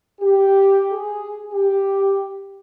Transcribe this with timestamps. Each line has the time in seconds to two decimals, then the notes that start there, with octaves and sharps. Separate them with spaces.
0.21 G4
0.91 G#4
1.53 G4